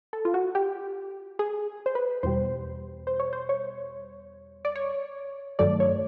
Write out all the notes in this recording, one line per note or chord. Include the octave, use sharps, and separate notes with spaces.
A4
F4
F#4
G4
G#4
C5
B4
E2 B2 G3 C5
C5
C#5
C5
C#5
D5
C#5
G2 D#3 F#3 A3 D5
C#5